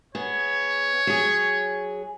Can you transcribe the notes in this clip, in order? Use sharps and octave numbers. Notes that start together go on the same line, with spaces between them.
B3 G#4 C#5
F#3 G#4